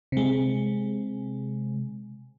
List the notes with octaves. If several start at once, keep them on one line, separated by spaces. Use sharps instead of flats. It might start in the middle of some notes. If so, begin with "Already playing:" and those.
C3 G#3